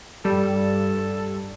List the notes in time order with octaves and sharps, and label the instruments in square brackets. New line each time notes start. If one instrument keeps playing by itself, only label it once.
[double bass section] G2 [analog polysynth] G3 [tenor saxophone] A4